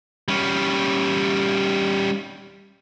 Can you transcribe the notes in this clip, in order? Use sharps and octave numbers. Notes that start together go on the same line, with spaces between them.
G3 C#4